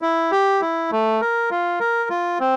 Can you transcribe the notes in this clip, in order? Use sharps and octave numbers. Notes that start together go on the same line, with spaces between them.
E4
G4
E4
A3
A#4
F4
A#4
F4
C4